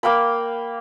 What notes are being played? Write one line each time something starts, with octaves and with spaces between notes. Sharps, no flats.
A#3 F5 G5 B5